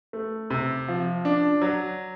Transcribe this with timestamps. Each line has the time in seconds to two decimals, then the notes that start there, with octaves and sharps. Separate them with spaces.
0.13 A3
0.50 C3
0.88 F3
1.25 D4
1.62 F#3